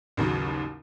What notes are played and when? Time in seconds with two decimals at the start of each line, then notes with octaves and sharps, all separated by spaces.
0.17 A1 D#2 C#3 F#3